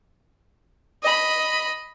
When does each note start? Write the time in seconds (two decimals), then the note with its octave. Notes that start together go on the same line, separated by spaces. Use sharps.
1.03 D#5 B5